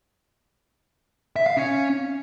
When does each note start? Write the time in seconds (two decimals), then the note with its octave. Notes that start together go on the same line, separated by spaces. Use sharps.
1.36 E5
1.46 F5
1.57 C#4